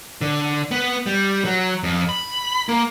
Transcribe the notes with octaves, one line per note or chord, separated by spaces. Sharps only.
D3
B3
G3
F#3
F2
B5
A#3